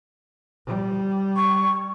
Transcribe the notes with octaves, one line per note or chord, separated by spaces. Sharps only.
G3
C#6